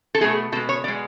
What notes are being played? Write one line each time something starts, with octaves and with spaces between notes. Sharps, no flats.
A4
B2 F#3 A3 G#4
B2 G#3 A4
C#5
B2 G#3 D5